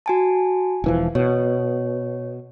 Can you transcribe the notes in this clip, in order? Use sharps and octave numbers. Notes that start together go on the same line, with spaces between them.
F#4 G#5 A5
E1 E3 F3
B2 C#5